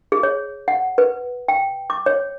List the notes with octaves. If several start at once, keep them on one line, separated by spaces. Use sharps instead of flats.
G#4
C#5
F#5
B4
G5
D6
C#5